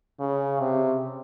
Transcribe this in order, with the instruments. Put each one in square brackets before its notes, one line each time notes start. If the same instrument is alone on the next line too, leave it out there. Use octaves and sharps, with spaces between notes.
[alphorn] C#3
C3